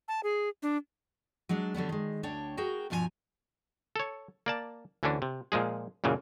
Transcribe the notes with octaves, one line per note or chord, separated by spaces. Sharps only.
A5
G#4
D4
F#3 G#3 D4 D5
D3 F#3 G3 B3
D#3 G#3
D2 D4 C#5 G5
F#4 G#4 A#4 G5
G2 B2 F3 G4 G#5 A#5
A4 C#5
A#3 D5 A5
D2 D3 E3 C#4 D4
C3
A#2 F3 G#3 G#4
F#2 A#2 C#3 E3